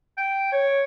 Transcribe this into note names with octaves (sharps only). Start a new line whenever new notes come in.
G5
C#5